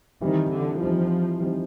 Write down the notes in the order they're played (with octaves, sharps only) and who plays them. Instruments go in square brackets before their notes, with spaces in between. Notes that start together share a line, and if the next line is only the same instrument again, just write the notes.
[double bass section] D#3 [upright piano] E3 G3 C4 D#4
[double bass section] D3
[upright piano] E3 G3 C4 D#4 [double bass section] F3
[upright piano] E3 G3 C4 D#4